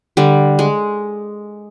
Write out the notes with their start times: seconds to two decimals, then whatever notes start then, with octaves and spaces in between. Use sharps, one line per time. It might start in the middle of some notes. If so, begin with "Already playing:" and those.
0.17 D3 G3
0.59 G#3